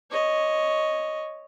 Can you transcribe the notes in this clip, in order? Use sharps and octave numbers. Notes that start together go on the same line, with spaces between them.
C#5 D#5